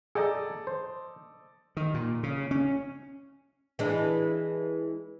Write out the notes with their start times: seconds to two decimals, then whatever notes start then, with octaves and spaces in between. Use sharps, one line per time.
0.15 G#4 A4 D5 D#5 G5 A#5
0.67 C5
1.77 D#3
1.94 A#2
2.23 C#3
2.51 C#4
3.79 E3 G#3 D4